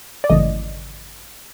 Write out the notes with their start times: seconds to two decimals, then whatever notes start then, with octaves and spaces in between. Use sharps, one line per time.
0.24 D5
0.30 G#1 F#2 C#3 E3 A3 D#5